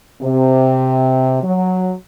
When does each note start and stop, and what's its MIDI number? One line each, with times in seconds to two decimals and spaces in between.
0.22 1.41 48
1.43 1.92 54